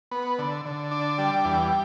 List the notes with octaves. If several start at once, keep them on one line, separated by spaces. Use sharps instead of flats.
B3
D3
D3
D4
G3
E2